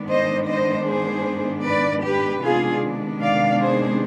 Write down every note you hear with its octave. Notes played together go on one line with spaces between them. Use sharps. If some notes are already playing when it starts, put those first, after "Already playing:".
Already playing: G#2 D#3 B3 D4
C5 D#5
C5 D#5
G#4 C5
B4 D5
G4 B4
C3 D#3 G#3 B3 D4 F4 G#4
D5 F5
G#4 C5